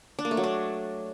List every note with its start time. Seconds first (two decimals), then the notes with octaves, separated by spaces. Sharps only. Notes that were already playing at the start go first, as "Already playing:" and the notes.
0.19 D4
0.25 A#3
0.31 A3
0.37 F#3
0.44 D4